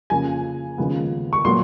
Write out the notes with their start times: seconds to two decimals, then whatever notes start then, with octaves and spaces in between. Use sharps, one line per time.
0.10 F2 C#3 F3 A#3 G#5
0.78 D#2 C#3 F3 G#3 B3
1.33 C#6
1.45 A#2 F#3 B3 C6